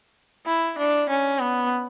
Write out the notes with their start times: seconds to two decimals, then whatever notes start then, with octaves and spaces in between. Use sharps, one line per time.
0.46 E4
0.78 D4
1.09 C#4
1.41 B3